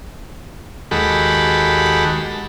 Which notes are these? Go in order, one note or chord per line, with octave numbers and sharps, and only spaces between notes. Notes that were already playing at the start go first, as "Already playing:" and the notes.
D#2 G#3 F#4 G4 A4 B5